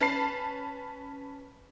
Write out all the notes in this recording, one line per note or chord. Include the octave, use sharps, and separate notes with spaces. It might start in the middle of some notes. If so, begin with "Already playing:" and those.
C#4 B4 A5 C7